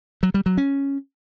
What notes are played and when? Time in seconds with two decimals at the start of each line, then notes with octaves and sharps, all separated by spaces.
0.23 F#3
0.34 G3
0.46 F#3
0.57 C#4